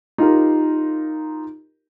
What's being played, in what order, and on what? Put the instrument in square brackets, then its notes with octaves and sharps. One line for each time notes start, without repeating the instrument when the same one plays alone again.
[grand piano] D#4 F4 G4 A#4